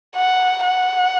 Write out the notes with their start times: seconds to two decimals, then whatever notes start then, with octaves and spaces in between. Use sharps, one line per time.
0.16 F#5
0.65 F#5